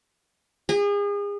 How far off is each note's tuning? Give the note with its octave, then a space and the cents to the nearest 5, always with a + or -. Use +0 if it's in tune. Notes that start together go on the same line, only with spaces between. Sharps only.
G#4 -35